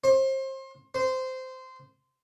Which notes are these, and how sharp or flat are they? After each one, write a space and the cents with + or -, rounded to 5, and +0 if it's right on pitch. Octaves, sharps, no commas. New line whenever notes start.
C5 +30
C5 -15